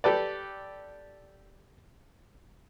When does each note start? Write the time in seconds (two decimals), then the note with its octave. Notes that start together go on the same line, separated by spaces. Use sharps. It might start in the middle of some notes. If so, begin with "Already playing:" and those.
0.04 G4 A4 B4 D5